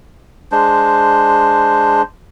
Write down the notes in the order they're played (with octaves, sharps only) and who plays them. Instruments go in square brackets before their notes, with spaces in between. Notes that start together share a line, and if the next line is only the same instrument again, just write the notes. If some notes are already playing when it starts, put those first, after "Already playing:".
[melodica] G#3 D4 C5